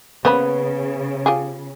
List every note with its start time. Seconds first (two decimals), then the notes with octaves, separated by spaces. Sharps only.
0.25 C#3 A#3 B3 C5 B5
1.26 F4 G4 G#4